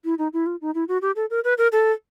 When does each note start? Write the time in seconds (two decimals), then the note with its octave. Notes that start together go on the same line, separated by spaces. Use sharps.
0.05 E4
0.18 D#4
0.33 E4
0.46 F4
0.61 D#4
0.75 E4
0.88 F#4
1.02 G4
1.16 A4
1.30 A#4
1.44 B4
1.58 A#4
1.72 A4